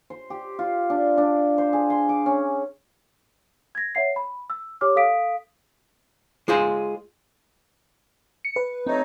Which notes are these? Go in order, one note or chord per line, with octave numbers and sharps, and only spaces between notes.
C5
G4
F4
D4
D4
C5
G#4
C6
D6
C#4
G#6 A#6
C#5 E5 F#5 C7
B5
E6
G4 C#5 D6 F6
A4 F5 D#6 B6 D7
G#3 F4 G#4 C5
C#7
B4
F#3 A3 C4 D#4